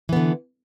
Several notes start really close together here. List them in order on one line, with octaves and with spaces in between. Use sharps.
E3 B3 D3